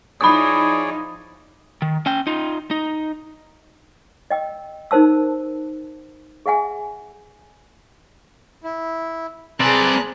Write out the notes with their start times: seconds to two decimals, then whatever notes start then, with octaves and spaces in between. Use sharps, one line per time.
0.21 F3 D#4 E4 G#4 C#5 D5 B5 D#6
1.82 D#3
2.06 C#4 G5
2.27 D#4 F4
2.71 D#4
4.30 D#5 G5 E6
4.91 D#4 A#4 C5 A5 E6
6.46 G#4 E5 F#5 G#5
8.64 E4
9.60 C4 G#4 B4 D5 A5 A#5 F#6